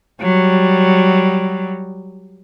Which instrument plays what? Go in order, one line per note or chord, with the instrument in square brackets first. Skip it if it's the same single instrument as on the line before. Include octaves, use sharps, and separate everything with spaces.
[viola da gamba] F#3 G3